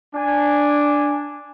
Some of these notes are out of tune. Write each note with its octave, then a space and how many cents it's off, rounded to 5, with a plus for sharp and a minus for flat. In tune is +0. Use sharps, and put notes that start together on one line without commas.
D4 +0 G#5 -10